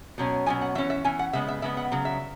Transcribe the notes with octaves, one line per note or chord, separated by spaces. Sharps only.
B2 F#3 C#4
B2 F#3 C#4 G#5
F#5
E3 C#4 E5
E5
E3 C#4 G#5
F#5
C#3 G#3 B3 E5
E5
C#3 G#3 B3 E5
F#5
C#3 F#3
E5